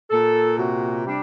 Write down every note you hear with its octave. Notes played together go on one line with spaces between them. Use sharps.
A#2 A4
C3 F#4
G3 D4